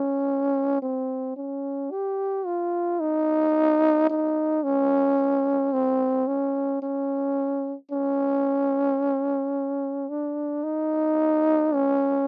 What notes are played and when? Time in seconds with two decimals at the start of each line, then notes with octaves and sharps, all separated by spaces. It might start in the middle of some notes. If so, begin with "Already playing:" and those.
Already playing: C#4
0.82 C4
1.36 C#4
1.91 G4
2.46 F4
3.00 D#4
4.10 D#4
4.64 C#4
5.73 C4
6.27 C#4
6.82 C#4
7.91 C#4
10.09 D4
10.64 D#4
11.74 C#4